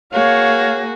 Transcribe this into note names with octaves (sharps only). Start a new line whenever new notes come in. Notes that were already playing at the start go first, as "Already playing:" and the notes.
A#3 F#4 G#4 C#5 F5